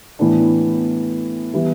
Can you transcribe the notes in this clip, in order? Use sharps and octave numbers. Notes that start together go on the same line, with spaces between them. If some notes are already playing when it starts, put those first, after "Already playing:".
A2 E3 B3 D4
E3 G3 B3 E4